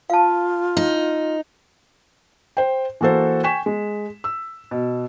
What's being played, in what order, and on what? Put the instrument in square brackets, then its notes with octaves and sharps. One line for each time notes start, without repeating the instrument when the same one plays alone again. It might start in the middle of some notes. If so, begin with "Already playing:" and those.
[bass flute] F4 [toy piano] F5 A5
[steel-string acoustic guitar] D#4
[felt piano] C5 G5
E3 A#3 F#4 A4 C5
G5 G#5 C#6 B6 E7
G#3
E6
B2